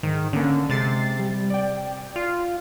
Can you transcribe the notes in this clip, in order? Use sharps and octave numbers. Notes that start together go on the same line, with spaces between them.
G#2 D#3
D3 A#3 C#4
C3 G#3 A6 C7
G3
D5 G5
F4